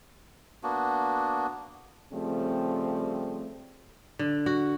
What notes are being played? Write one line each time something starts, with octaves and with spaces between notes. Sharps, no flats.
A#3 B3 D4 F#4
C#3 F3 G3 A3 C4
D3
F#4